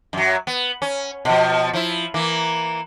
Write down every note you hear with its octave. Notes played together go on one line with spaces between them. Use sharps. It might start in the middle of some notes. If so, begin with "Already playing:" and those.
F#2 F#3
B3
C#4
B2 F3
F3 E4
E3 A#3